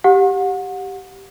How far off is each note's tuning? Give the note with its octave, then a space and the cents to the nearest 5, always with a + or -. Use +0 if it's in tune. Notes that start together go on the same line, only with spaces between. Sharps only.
G4 -5 F#5 -30